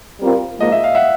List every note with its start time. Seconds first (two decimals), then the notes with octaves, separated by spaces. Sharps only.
0.20 G3 C4 F4 A#4
0.58 G#2 F3 A#3 D#5
0.72 E5
0.84 F5
0.95 E5 F#5